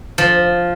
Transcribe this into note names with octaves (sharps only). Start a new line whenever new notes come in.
F3